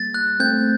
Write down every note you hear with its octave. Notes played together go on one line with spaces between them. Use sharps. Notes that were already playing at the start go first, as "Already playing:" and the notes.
Already playing: G3 A#3 A6
F#6
A3 C4 G6